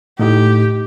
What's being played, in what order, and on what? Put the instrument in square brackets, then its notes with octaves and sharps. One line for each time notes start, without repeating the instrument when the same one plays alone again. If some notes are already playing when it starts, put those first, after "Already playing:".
[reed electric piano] A2 D#4 [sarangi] G4